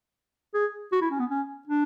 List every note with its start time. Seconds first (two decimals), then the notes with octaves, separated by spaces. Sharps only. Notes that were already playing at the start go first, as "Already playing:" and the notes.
0.54 G#4
0.92 F#4
1.01 E4
1.11 C#4
1.20 B3
1.30 C#4
1.68 D4